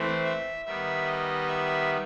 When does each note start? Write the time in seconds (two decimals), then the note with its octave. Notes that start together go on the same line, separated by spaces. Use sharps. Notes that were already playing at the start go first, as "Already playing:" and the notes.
Already playing: E3 A3 C4 C5
0.24 E5
0.65 D#3 G3 B3 E5
1.07 D#5
1.48 E5